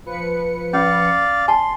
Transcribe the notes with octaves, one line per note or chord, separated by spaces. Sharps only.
F3 B4 C#7
C#4 D5 F5
G#5 A5 C6